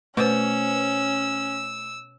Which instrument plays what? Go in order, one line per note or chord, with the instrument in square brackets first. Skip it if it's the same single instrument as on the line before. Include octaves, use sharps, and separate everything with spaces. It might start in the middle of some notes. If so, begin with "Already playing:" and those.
[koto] B2 [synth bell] A3 C5 [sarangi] C#4 [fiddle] E6